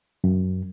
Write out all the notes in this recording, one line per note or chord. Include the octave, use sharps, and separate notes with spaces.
F#2